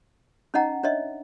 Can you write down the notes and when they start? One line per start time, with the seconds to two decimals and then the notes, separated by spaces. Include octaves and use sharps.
0.54 C#4 D#4 D#5 F#5 A#5
0.83 D4 C#5 D#5 E5